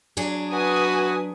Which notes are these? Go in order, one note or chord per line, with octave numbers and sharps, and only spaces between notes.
F#3 D4 G#4
F#4 B4 G#5 D#6